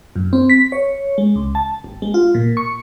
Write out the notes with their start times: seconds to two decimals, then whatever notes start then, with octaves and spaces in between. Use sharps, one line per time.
0.16 F#2
0.33 C4
0.50 B6
0.72 C#5
1.18 G#3
1.36 C#2
1.55 A5
1.84 G#1
2.02 G#3
2.14 F4
2.35 A#2
2.57 C#6